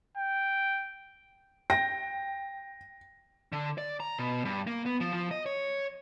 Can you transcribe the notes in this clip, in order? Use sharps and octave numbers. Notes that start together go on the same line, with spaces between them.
G5
G5 A#6
D3
D5
A#5
B2
G2
A#3
B3
F3
F3
D#5
C#5